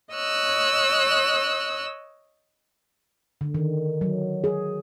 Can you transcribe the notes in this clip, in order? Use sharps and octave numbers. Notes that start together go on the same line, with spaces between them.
C#5 D#5 E6 F#6
D3
D#3
F#3
G#4